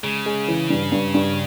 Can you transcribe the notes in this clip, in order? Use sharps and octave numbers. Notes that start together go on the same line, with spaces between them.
C#3 G#3
G#3
E3
G2
G2
G2